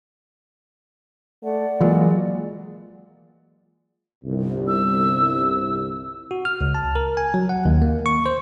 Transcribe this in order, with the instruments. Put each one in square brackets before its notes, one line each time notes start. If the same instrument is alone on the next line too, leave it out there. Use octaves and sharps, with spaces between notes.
[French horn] A3 [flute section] D5 F#5
[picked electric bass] E3 F#3 [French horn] G#3 [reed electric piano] A#3 F4
[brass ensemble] G1 C2
[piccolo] E6
[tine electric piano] F#4
F6
C#2
A5
A#4
G#5
F#3
F#5
D#2
A#3
C#6
C5